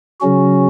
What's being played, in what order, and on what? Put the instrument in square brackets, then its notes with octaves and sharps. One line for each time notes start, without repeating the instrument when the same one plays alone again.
[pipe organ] C#3 F#3 C#4 F#4